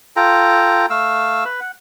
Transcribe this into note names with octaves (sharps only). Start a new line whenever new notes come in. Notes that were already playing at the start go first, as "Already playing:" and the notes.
F4 A4 G5 A#5
A3 F5 E6
B4
F#5